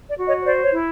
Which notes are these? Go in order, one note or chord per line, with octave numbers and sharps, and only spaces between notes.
D5
F#4
C#5 D#5
C#5
C5 D5
C#5
E4